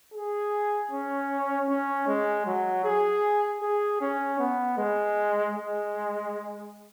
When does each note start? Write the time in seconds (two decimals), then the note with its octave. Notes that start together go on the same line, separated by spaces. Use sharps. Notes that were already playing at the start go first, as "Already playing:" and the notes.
0.14 G#4
0.91 C#4
1.69 C#4
2.08 G#3
2.46 F#3
2.85 G#4
3.62 G#4
4.01 C#4
4.39 B3
4.78 G#3
5.55 G#3